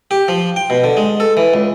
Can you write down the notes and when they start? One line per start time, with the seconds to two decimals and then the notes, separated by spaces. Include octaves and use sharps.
0.11 G4
0.28 F3
0.56 G5
0.70 B2
0.84 D3
0.97 G#3
1.20 A4
1.37 E3
1.54 C#2